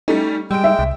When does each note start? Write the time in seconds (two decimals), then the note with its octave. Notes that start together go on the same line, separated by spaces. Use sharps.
0.08 G3 A3 C#4 D#4
0.51 G3 G#3 G5 E6 D7
0.64 E5
0.79 C2